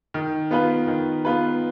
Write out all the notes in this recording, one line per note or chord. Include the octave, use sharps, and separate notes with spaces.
D#3
B3 F4 B4
D#3
B3 F4 B4